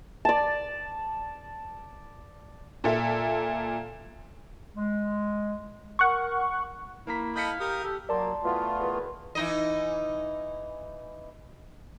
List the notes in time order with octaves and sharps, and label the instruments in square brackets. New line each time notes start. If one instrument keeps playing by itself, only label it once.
[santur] D5 A5
[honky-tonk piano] A#2 A4 E5
[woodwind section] G#3
[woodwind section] A#4 [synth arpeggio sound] F#5 C#6
[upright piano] A#3 A#5 B6 [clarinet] E4
[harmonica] A4 D#5 B5 [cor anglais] F5 [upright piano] G6 B6 C#7
[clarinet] G4 [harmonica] A#4 D#6
[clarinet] G4 [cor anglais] A4
[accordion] F#3 [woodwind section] A#3 [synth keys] D5 A5 C6
[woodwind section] B2 E3 [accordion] A3 B3 F4
[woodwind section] C#2 F#2 E3
[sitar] E3 D#4 D#5